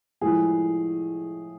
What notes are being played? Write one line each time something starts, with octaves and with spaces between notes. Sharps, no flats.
A2 F3 G#3 G#4